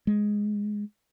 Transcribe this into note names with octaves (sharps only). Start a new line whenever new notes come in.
G#3